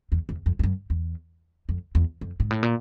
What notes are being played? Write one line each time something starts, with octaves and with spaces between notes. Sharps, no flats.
E2
E2
F2
F2
F#2
E2
F2
E2
F2
G#2
A2
A#2